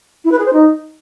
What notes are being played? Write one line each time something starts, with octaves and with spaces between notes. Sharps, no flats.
E4
B4
G#4
C5
D#4